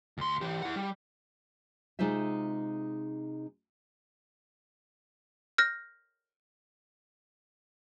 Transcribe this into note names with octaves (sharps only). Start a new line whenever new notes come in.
D2 C6
E3 G4
E4 F#5
G3
C3 G#3 D#4 F4 C5 E5
F6 G6 A#6